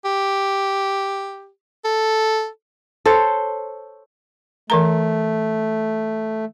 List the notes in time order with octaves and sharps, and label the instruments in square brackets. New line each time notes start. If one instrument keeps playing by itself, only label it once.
[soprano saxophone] G4
A4
[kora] A4 C5 C#5
[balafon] E3 A#4 A#5 [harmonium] A3